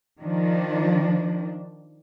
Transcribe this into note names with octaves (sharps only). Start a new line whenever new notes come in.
D#3 F3 D4